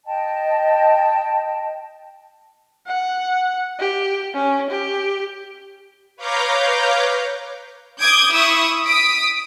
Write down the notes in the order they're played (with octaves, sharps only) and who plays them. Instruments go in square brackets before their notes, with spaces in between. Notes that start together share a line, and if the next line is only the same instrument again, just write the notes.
[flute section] D#5 G5 A5
[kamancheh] F#5
G4
C#4
G4
[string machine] B4 C#5 F5 A#5 D6 G6
[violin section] D6 D#6 G6 G#6 D7
E4 C#6 D#6 E6
D#6 B6 D7